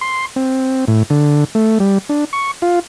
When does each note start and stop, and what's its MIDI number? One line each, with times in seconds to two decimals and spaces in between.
0.01 0.26 84
0.36 0.85 60
0.88 1.03 45
1.10 1.44 50
1.55 1.78 57
1.80 1.98 55
2.09 2.25 62
2.33 2.51 85
2.62 2.79 65